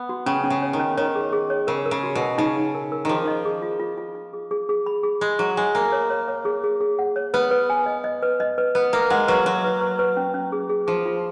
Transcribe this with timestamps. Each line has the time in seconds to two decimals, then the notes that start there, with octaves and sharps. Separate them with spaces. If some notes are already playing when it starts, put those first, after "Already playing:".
Already playing: B3
0.09 F#4
0.26 C#3 C#4
0.43 C#4
0.50 C#3
0.62 C#5
0.73 D#3
0.80 C#4
0.97 D#3 C#5
1.15 G#4
1.33 G#4
1.50 C#5
1.67 C#3 A#4
1.86 A#4
1.91 C#3
2.04 F#4
2.15 B2
2.21 A#4
2.38 C#3 D#4
2.56 D#4
2.75 A#4
2.92 A#4
3.05 D#3 F3 G#4
3.27 D#5
3.45 G#4
3.62 F4
3.80 F4
3.98 F4
4.15 F4
4.33 G#4
4.51 G#4
4.69 G#4
4.86 B5
5.03 G#4
5.21 G#3 B5
5.39 F#3 G#4
5.57 G#3 G#5
5.75 A#3 G#5
5.92 C#5
6.10 C#5
6.28 C#5
6.45 G#4
6.64 G#4
6.80 G#4
6.99 F#5
7.16 C#5
7.34 B3 B4
7.51 B4
7.70 G#5
7.86 D#5
8.04 D#5
8.23 B4
8.40 D#5
8.58 B4
8.75 B3 B4
8.93 A#3 B4
9.10 G#3 F#5
9.28 F#3 B4
9.46 F#3 F#4
9.64 B4
9.81 B4
9.99 B4
10.17 C#4
10.34 C#4
10.52 G#4
10.70 G#4
10.87 F3 G#4
11.06 F4